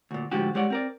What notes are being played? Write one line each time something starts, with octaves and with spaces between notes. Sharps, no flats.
D2 A#2
A2 D3 F3 G#3 F#4 G4
G2 G#3 G4 C#5 D5 F#5
C4 A#4 D5